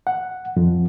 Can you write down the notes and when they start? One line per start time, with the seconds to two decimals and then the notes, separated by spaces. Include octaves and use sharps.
0.07 F#5
0.56 F2